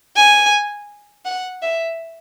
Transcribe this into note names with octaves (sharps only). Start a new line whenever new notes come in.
G#5
F#5
E5